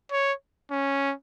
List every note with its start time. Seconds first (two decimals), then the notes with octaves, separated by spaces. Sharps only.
0.11 C#5
0.71 C#4